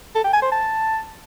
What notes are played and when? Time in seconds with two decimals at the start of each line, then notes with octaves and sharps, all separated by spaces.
0.15 A4
0.24 G5
0.33 G#5
0.42 C5
0.51 A5